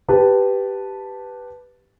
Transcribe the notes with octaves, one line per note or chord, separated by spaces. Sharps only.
G4 B4 A5